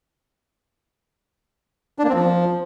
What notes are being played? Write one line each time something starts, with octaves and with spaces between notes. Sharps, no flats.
D4
A#3
C4
F3